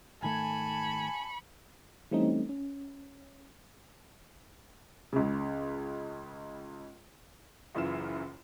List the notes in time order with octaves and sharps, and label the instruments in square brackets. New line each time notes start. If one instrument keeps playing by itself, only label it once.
[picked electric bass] G#1 D#3 A3 [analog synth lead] G#5 [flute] A5 [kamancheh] B5 C#6
[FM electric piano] E3 G3 A3 C4 C#4 D#4
C#4
[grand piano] C#2 C#3
[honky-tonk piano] F#1 F#2 E3 E4 F4 E7